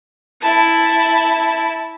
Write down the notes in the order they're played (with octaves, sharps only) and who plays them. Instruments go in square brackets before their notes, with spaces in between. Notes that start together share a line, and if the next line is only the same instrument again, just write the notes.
[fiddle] E4 A5